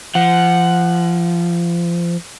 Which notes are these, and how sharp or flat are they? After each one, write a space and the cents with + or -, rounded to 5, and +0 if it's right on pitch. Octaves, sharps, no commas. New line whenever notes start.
F3 -25 F#5 +0